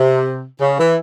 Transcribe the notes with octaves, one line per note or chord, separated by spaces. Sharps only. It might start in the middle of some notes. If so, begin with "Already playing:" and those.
Already playing: C3
C#3
E3